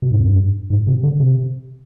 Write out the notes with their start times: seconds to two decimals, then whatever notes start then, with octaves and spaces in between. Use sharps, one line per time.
0.02 B2
0.11 G#2
0.19 F2
0.27 G2
0.70 G#2
0.87 C3
1.03 D3
1.20 C3